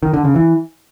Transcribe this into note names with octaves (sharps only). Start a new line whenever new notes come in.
D#3
D3
C#3
E3